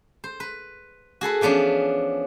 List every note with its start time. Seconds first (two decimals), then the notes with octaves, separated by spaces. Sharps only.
0.24 C5
0.40 B4
1.21 F#4 G#4 A4 B4
1.41 E3 F3 B3 C#4 D4